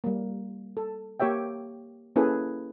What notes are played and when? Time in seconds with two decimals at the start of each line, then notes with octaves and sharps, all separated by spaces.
0.04 G3 A#3
0.77 A4
1.20 A#3 G4 C#5 E5 G5
2.16 A#3 C#4 E4 G#4 A4 B4